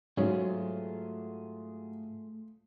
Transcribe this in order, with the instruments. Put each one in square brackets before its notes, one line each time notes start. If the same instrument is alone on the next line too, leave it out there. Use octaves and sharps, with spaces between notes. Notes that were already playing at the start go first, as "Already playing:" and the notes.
[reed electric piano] G#2 [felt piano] F#3 [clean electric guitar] A3 F4 G#4 [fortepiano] C#4